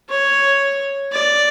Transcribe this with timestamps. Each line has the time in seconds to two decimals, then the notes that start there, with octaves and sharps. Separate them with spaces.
0.10 C#5
1.12 D5